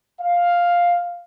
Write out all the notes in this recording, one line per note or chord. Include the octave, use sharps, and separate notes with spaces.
F5